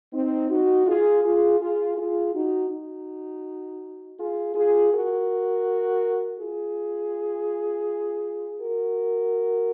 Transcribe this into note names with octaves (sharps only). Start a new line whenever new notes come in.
C4 D#4
D#4 F#4
F4 G#4
F4 G#4
F4 G#4
F4 G#4
D#4 F#4
D#4 F#4
F4 G#4
F4 G#4
F#4 A#4
F4 G#4
F#4 A#4